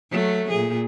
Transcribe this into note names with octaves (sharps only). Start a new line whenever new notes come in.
F#3 A3
A#2 G#4